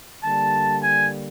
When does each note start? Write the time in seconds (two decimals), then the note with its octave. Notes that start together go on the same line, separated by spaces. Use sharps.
0.23 D3 G3 A#3 A5
0.83 G#5